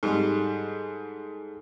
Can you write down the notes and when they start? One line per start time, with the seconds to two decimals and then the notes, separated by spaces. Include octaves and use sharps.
0.03 G#2 G3 G#4 A4